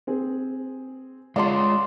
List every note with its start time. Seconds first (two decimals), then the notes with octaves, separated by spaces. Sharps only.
0.07 C4 G#4
1.36 G#3 F4 D5 F5 F#5 C6